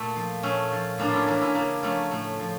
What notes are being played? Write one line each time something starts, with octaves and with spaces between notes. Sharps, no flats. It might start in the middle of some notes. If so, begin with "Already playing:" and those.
Already playing: A#2 A3
F3
A#2 A3 C#4
F3
A2 A#3 D4
F4
C#4 E4
E3 A#3 D4
C#4 E4
C#3 A#3 D4
F3 A3 C#4
A2 A3
F3